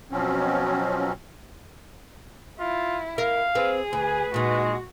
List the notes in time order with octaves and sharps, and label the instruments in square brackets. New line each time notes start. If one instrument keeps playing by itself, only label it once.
[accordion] B2 F3 F#3 C4 C#4
[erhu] E4 [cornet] F4
[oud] A#4 [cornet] F5
[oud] C4 B4 [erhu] G#4
[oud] D2 [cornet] B4 [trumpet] G#5
[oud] A#2 D#4 [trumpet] G#3 [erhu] F#4